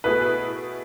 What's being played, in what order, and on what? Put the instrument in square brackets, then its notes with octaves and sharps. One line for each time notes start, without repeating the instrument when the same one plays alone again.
[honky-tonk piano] B2 A3 E4 G#4 [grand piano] B4